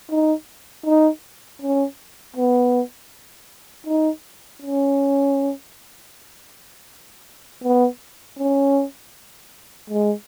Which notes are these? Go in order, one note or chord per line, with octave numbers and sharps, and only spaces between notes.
D#4
D#4
C#4
B3
D#4
C#4
B3
C#4
G#3